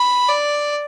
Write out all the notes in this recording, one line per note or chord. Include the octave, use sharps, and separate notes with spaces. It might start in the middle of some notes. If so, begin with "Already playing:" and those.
Already playing: B5
D5